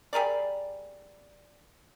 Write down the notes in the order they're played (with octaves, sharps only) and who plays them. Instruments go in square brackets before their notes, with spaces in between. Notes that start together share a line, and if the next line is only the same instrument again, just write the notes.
[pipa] G3 G#4 A#4 D5